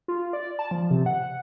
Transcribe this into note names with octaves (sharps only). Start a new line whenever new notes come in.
F4
D5
A5
F3
C3
F#5